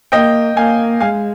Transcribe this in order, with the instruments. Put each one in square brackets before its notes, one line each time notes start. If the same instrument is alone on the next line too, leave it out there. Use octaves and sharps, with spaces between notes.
[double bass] A#3 [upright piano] D#5 G5
[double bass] A#3 [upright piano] F5 G#5
[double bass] G#3 [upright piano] F5 G#5